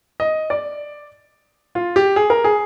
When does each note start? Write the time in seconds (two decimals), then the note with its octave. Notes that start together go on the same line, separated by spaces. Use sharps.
0.20 D#5
0.50 D5
1.75 F4
1.96 G4
2.16 G#4
2.30 A#4
2.44 G#4